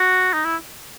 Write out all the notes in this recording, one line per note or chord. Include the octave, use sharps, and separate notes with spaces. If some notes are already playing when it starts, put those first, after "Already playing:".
Already playing: F#4
D#4
E4